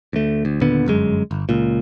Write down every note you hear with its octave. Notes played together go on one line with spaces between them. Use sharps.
D2 A3
D2
D#2 A#2 D3 B3
G1 F#2 G#3
G1
C#2 A#2